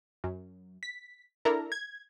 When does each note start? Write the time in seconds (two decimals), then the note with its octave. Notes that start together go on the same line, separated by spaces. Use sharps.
0.24 F#2
0.83 B6
1.45 D4 E4 A4 A#4 A#5
1.72 G#6